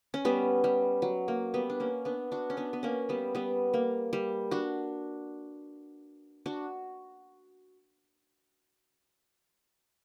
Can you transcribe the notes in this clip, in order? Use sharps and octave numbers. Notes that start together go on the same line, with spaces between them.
C#4
G3 B3
G3
F#3
A#3
G3 B3
D4
A#3 C#4
B3 D4
D4 F#4
C#4
B3 D4
B3
A#3 C#4
G3 B3
G3 B3
A#3
G3
D4 F#4
D4 F#4